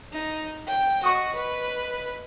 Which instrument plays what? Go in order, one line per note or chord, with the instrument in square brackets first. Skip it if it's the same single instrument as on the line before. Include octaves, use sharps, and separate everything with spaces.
[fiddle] D#4
G5
[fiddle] F#4 [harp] D#5 C#6 D#6
[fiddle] B4